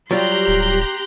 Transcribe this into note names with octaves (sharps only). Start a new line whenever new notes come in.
F#3 G3 F4 G4 A#5 C6 F#6 G6
D1